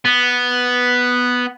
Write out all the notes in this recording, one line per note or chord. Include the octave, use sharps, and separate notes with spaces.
B3